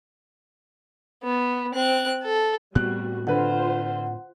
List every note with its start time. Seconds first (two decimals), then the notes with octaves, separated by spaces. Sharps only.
1.23 B3
1.74 C4 F#6
2.23 A4
2.75 A2 G3 B3 C4 F#4 F#6
3.27 D3 F4 B4 C5 F#5